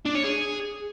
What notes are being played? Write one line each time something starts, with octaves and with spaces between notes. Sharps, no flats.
D4
C#5
G#4